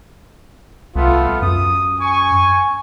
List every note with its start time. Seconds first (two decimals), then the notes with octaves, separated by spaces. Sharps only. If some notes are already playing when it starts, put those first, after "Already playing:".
0.96 C2 A3 B3 F4
1.42 F#2 D#6
2.01 G#5 C#6